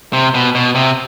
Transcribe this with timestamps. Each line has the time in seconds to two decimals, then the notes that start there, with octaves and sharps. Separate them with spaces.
0.13 C3
0.34 B2
0.55 B2
0.75 C3